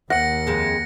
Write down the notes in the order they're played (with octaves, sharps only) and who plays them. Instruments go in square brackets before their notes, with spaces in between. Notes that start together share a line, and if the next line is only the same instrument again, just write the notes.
[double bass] D#2 A#3 [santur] F#5 [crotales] A#6 C#7
[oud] F2 G#3